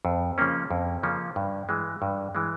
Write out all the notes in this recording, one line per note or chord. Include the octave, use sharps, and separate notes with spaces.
F2
C#3 F3 A#3 C#4
F2
C#3 F3 A#3 C#4
G2
E3 G#3
G2
E3 G#3